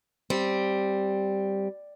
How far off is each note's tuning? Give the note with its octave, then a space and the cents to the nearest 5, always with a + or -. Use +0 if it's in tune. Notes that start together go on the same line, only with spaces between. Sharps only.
G3 +0 C4 +0